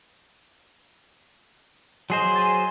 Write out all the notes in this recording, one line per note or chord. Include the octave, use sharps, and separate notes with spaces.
F#3 G#4 C5 D#5 C6
G#5 C6 A6